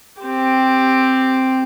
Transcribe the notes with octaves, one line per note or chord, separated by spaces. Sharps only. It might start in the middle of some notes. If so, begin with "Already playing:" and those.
C4 G4